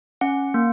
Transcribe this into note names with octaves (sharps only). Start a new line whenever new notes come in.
C#4 F#5
A#3